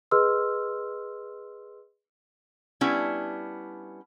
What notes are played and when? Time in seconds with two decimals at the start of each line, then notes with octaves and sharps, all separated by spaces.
0.11 G#4 B4 D#5 C6 E6 F6
2.81 G3 B3 C#4 D4 E4